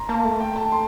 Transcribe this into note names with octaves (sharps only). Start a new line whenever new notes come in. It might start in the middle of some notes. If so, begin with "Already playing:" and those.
Already playing: A#5 C6
A#3 A5
A3
G5
A5
C6